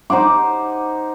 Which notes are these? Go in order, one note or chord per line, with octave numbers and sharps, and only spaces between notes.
D#4 C5 F#5 D6